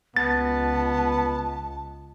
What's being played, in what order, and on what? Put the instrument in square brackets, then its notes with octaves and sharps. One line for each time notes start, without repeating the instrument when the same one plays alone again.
[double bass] C#2 [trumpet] B3 [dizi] A5 [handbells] A6